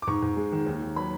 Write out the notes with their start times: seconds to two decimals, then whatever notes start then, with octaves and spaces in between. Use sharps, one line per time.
0.02 D6
0.07 G#2 C#6
0.22 G#2
0.37 G#3
0.52 D#3
0.66 D#2
0.82 D#2
0.96 F#3 B5